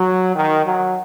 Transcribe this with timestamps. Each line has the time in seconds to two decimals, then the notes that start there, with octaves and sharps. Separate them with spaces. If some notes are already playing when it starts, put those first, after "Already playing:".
Already playing: F#3
0.36 D#3
0.65 F#3